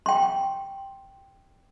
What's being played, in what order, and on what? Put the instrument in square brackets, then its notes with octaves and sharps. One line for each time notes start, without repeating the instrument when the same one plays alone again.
[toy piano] G5 C6